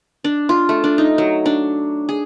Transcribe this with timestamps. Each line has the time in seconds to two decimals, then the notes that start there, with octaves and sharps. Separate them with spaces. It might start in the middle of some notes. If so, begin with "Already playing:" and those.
0.24 D4
0.49 F4
0.69 A3
0.84 D4
0.98 D#4
1.18 F#3
1.46 D4
2.09 G#4